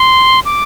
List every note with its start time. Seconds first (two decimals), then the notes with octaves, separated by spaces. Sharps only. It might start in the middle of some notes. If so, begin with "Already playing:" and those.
Already playing: C6
0.45 D6